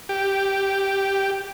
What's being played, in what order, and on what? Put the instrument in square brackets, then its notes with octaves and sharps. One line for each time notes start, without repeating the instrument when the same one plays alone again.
[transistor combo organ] G4